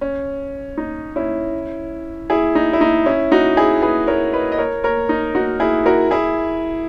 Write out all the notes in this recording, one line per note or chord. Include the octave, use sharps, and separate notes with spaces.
C#4
D#4
C#4 E4
E4 G#4
D#4
E4
D#4
C#4 E4
D#4 F#4
E4 G#4
G#4 B4
A#4 C#5
B4 D#5
D#5
A#4 C#5
A#4 C#5
D#4
D#4 F#4
E4 G#4
F#4 A#4
E4 G#4